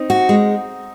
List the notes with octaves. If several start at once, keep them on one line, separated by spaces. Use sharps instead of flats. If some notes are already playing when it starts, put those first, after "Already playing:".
Already playing: C4 D#4
F#4
G#3